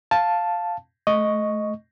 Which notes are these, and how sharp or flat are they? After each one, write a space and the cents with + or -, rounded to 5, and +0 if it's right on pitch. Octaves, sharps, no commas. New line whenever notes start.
F5 +0 A5 +0
A3 -25 D#5 +0 C#6 +0